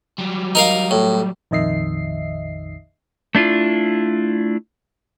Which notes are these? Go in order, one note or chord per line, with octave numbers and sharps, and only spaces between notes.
F#3 G3
D#4 A#4 F5
A2
A#1 F2 D#3 D#5 E5 C7
A3 D4 E4 F4